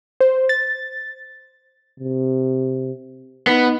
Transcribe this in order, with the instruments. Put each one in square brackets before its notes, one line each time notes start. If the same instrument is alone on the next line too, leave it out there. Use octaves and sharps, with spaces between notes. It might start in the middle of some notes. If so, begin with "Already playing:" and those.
[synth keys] C5
A6
[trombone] C3
[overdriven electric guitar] B3 [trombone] D#4